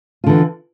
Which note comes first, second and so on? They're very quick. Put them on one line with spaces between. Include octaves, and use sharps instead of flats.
F4 D3 E3